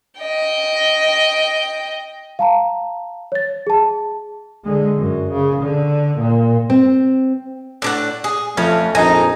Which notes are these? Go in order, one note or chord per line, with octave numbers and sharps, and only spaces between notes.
D#5 G5
F5 A5 A#5
C#5 A6
G#4 A5
D3 G#3
F#2
C#3
D3
A#2
C4
A2 D4 F#5
G#4
F2 A3 C#4
A#1 F2 D#4 A4 D#5 G#5 A#5